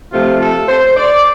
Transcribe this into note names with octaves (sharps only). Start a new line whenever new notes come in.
C3 F3 A3 F4
A4
C5
D5